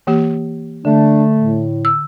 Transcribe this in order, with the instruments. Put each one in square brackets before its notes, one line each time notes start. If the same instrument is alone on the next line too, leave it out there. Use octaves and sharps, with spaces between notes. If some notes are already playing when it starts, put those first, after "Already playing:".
[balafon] E3 A#3 G4
[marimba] D3 [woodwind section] A3 [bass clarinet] D4
[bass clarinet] A2
[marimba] E6